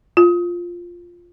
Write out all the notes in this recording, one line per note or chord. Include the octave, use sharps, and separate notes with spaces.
F4